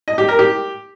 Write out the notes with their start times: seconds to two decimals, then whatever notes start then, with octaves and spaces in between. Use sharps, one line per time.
0.08 D#5
0.18 G4
0.28 A#4
0.39 G4